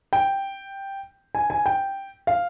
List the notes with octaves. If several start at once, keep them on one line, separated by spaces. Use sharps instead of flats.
G5
G#5
G#5
G5
F5